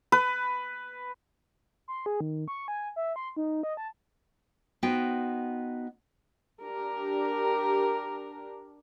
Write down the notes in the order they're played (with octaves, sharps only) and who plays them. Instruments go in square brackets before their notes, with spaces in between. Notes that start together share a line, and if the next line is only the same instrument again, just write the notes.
[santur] B4
[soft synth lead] C6
G#4
D#3
C#6
G#5
E5
C6
D#4
D#5
A5
[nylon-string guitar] B3 D#4 F#4 C5 G5
[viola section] D4 G4 A#4